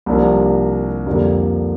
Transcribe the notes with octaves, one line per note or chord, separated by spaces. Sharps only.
C2 C3 F3 A#3 D4
F2 D3 G3 A#3